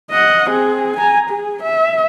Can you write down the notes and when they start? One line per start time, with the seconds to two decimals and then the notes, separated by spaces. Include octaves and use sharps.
0.11 D#5 F#5
0.50 C4 G#4
0.97 G#5 A#5
1.30 G#4
1.62 E5